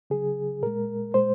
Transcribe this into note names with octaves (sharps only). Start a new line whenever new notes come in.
C#3 F#3 G#4
A#2 G#3 A#4
A#2 G#3 C5